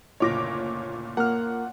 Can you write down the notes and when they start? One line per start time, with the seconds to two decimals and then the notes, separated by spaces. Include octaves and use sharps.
0.20 F#1 D2 A#2 C#5 D6 A#6
1.17 A#3 F#5 F6